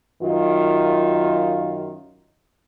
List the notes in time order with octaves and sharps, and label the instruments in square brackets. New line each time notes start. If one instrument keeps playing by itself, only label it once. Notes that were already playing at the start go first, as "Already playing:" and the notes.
[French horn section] F#2 D#3 F4